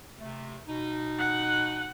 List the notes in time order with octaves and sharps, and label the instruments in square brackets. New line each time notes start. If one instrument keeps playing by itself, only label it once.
[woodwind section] C3 A3
B2 D#4
[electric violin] F#5 F#6